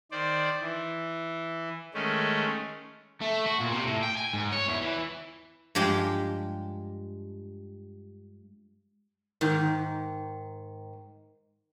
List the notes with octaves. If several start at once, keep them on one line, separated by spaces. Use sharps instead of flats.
D#3 C5 D5
E3
D#3 G#3 A3 C#4
A3
F#4
A#2
C3
A2
G5
G#5
G#2
C#5
E2
E3
G2 F3 G#3 G4 G5
G#2 D#3